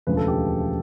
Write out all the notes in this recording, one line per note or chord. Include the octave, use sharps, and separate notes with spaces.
E1 D2 C#3 F3 B4
A4
G4